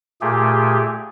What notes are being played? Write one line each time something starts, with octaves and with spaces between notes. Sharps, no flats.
A#2 A3 G4 G#4